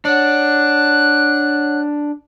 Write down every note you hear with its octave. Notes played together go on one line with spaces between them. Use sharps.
D4 C#5 F#5 F#6